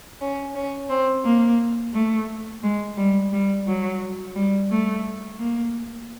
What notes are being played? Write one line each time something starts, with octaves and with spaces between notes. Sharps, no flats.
C#4
C#4
C4
A#3
A3
G#3
G3
G3
F#3
G3
A3
A#3